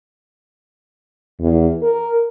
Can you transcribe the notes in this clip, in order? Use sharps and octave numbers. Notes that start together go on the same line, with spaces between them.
E2
A#4